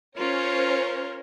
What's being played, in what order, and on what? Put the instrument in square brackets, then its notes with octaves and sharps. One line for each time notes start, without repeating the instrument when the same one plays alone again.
[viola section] C#4 A#4 [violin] F4 [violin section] C5 C#5